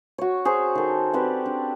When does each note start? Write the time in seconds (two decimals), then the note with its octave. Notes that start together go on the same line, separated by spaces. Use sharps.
0.18 F#4 C#5
0.45 G#4 C5 C#5
0.75 D#3 A4
1.14 C4 G4 B4 D5
1.46 D4